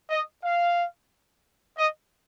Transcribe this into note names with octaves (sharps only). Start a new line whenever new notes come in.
D#5
F5
D#5